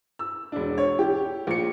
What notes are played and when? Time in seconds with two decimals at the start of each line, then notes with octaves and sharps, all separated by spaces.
0.19 E6
0.52 E1 D4
0.78 C#5
0.99 G4
1.47 A#1 C#7